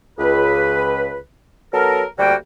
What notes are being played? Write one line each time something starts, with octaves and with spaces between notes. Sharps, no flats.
C#2 B4
F#3 B3 A4 A#4
D2 D3 G3 A#3 F#4 G5